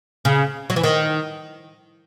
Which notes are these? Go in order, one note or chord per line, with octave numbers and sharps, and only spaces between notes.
C#3
F#3
E3
D#3